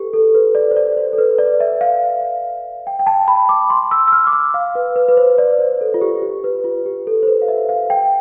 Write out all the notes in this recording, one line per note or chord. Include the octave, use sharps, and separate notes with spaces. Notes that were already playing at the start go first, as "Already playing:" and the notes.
Already playing: G4 A4 B4
A4
B4
D5
C5
D5
C5
A4
B4
D5
E5
F5
G5
G5
A5
B5
D6
C6
E6
E6
F6
D6
E6
F5
B4
B4
B4
C5
D5
C5
A4
F4
G4
G4
B4
F4
G4
A4
C5
B4
F5
E5
F5
G5